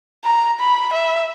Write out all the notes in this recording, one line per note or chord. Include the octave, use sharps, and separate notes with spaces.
A#5
B5
E5